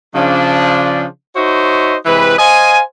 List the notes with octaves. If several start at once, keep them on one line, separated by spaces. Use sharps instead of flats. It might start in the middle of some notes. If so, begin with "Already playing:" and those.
C#3 F3 D4
D#4 F#4 C5 C#5 D#5 E5
C3 E3 G#3 B4
C5 D#5 F5 G#5